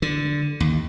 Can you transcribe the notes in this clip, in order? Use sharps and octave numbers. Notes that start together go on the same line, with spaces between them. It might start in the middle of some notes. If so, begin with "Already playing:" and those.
D3
D#2